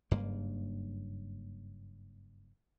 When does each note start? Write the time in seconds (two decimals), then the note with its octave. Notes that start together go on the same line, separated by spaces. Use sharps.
0.11 F#1 G2 A#3